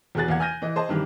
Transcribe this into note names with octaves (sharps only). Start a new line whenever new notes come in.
E2 B2 G#4 F#6 A6
E2 A#3 F5 F#5 G#6
G#5 F6 G6 G#6 A#6 D#7
E3 D#5
G#4 C5 D#5 A5
G2 C3 D#3 E3 G3